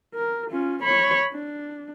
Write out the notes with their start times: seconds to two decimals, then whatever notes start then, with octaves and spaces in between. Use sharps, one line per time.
0.15 A#4
0.50 C#4 F4
0.83 C#5 B5
1.33 D4